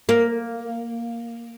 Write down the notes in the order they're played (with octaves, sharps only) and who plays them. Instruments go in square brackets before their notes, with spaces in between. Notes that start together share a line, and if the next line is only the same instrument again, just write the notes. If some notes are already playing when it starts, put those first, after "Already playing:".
[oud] A#3